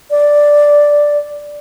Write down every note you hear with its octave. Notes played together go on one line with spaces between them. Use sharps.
D5